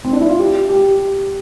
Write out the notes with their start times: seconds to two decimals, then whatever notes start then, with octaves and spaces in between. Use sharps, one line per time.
0.05 C4
0.13 D4
0.21 E4
0.29 F4
0.39 G4
0.69 G4